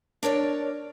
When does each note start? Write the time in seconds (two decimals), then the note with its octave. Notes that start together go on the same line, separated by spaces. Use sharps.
0.23 D4 A#4 C#5 D5